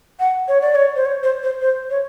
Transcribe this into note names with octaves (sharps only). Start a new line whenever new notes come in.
F#5
C#5
D5
C#5
C5
C#5
C5
C5
C5
C#5